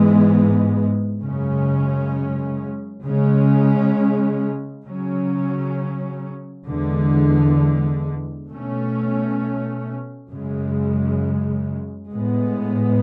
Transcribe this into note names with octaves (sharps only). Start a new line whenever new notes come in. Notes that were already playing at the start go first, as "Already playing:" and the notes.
Already playing: G#2 E3 G#3 B3
F#2 C#3 G#3 C#4
C#3 G#3 C#4
C#3 F#3 C#4
E2 D3 G#3
B2 A3 C#4
F#2 C#3 G#3
A2 G#3 B3